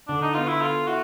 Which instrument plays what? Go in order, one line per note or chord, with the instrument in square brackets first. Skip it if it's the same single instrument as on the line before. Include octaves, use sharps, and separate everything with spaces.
[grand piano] D3 [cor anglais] D4
[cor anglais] D#4
[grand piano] B3 [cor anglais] F4
[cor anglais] E4
[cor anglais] F4 [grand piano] A4
[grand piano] E4 [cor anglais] F#4